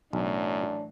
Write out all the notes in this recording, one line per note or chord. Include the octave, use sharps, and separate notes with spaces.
B1 F#2 A2 E3 F#3 D4